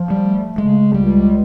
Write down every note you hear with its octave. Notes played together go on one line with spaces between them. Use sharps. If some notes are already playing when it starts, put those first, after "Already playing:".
Already playing: F3
G3
A3
C#3 G#3
C#2 G3